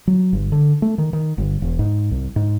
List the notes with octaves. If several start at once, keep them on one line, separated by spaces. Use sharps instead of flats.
F#3
G1
D3
A3
D#3
D#3
G1
E1
G#2
C2
G#2